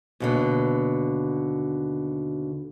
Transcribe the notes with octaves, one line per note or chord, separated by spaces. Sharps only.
D#2 B2 D3